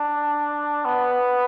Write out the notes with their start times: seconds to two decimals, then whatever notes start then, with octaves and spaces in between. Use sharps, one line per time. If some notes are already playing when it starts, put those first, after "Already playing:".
Already playing: D4
0.85 B3